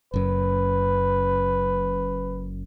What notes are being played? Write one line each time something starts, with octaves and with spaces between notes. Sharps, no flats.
F#1 F#2 B4